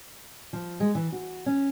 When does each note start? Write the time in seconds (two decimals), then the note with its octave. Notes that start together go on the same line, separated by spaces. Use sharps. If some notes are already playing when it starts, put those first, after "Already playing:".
0.53 F3
0.80 G#3
0.95 E3
1.12 F#4
1.46 C#4